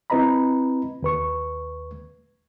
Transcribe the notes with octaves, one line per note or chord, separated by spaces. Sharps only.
C4 E4 B4 D#5 A#5 B5
D#2 B4 C#6